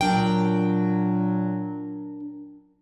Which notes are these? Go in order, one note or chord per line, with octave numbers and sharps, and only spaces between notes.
A#2 F#3 D4 A#4 G5